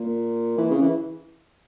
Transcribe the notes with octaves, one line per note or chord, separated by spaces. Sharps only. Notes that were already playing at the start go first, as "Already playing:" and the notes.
Already playing: A#2
E3
C#3
E3